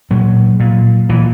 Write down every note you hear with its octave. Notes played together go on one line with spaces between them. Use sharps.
A#2 F#3
A#2
A#2 E3